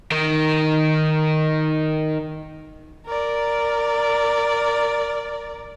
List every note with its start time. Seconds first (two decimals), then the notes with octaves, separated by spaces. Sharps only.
0.12 D#3 A#4
3.06 A#4 D5